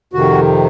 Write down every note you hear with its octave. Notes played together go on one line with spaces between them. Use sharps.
F2 C3 D#3 F#4